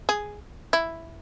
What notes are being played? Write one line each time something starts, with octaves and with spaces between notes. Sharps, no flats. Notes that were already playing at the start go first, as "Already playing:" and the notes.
G#4
E4